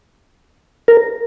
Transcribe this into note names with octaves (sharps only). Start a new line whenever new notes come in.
A#4